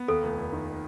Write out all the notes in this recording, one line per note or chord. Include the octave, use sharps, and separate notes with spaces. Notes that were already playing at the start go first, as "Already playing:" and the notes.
Already playing: B3
D#2 A4
F1
F1
D#3